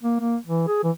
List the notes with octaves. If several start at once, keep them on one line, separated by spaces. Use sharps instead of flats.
A#3
A#3
E3
G#4
E3